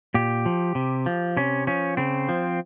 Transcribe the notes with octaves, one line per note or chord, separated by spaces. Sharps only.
A#2 G4
F3
C3
F3
C3 C#4
F3 C#4
C#3 C4
F3